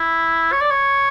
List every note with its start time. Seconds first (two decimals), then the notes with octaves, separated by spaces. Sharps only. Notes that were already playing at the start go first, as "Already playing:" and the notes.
Already playing: E4
0.52 C#5
0.61 D5
0.71 C#5